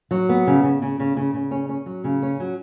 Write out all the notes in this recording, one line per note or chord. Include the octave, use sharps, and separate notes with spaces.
F#3
B3
C#3
C#3
C#3
C#3
C#3
C#3
C#4
C#4
F#3
C#3
C#4
F#3